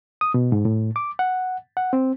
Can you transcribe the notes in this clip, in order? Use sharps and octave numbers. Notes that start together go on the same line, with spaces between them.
D#6
B2
G#2
A2
D6
F#5
F#5
C4